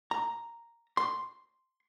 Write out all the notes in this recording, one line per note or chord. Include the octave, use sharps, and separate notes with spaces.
A#5
C6